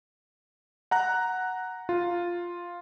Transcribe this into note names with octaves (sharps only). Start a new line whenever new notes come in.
F#5 A#5 F#6
F4